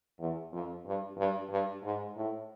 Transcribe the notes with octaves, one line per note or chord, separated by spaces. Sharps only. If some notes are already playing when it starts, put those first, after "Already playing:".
E2
F2
G2
G2
G2
G#2
A2